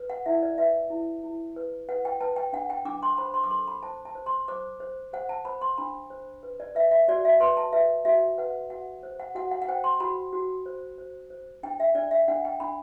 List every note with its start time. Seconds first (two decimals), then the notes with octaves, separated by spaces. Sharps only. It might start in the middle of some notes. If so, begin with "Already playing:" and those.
Already playing: B4
0.10 F#5
0.26 E4 E5
0.43 D5
0.58 B4 E5
0.90 E4
1.23 E4
1.56 B4
1.89 B4 F#5
2.05 G5
2.20 B4 A5
2.36 G5
2.53 D4 F#5
2.70 G5
2.85 D4 D6
3.03 C6
3.18 C5 B5
3.34 C6
3.44 D6
3.51 A4 C6
3.68 B5
3.83 C5 A5
4.05 A5
4.15 C5
4.26 C6
4.48 C5 D6
4.80 C5
5.13 C5 F#5
5.29 A5
5.45 C5 B5
5.61 C6
5.78 D4 B5
6.10 C5
6.43 B4
6.60 D5
6.75 B4 E5
6.91 E5
7.08 F#4 D5
7.25 E5
7.40 B4 C6
7.57 A5
7.73 B4 E5
8.05 F#4 E5
8.38 B4 F#5
8.70 F#4 F#5
9.03 C5
9.20 F#5
9.35 F#4 F#5
9.51 F#5
9.62 F#5
9.68 C5 G5
9.84 C6
10.00 F#4 B5
10.33 F#4
10.66 C5
10.98 C5
11.30 C5
11.63 D4 G5
11.80 E5
11.95 D4 D5
12.11 E5
12.28 D4 F#5
12.45 G5
12.60 D4 B5